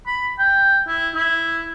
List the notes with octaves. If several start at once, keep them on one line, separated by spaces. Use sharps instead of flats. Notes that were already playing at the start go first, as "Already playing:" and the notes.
B5
G5
E4
E4